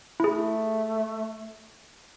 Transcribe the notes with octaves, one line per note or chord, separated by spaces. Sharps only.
A3 E4 G#4